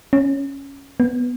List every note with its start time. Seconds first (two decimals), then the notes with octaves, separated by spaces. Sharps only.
0.13 C#4
1.00 B3